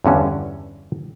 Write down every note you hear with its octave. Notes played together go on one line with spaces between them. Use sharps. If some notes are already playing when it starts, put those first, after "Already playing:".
E2 G2 D3 C#4